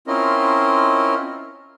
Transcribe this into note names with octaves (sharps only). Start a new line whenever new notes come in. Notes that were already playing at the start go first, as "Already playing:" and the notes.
C4 C#4 E4 F4 A#4 D#5